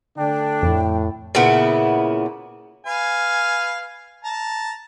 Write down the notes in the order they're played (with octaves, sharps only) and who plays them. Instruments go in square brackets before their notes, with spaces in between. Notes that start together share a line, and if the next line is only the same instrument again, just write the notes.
[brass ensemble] D3 A3 D4 [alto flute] G5
[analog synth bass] F2 [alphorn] A2
[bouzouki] A#2 C#3 B3 E4
[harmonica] B4 F5 G#5
A5 A#5